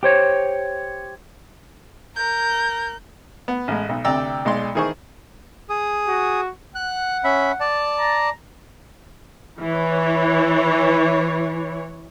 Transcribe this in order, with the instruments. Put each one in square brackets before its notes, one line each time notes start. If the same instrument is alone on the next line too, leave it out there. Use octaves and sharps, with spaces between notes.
[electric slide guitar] G4 C5 C#5
[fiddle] A#4 [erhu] G6
[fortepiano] B3
A1 G#3
B1
D2 C3 D5 G5 A#5 E6
B1 G#3 D5 C6
D#3 E3 G#4 C5 C#6
[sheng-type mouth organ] G#4 D#6
[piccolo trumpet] F#4
[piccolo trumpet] F#5 [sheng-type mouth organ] F#6
[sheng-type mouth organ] C#4 E5 B5
D5 A5
[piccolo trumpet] A#5
[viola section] E3 C#5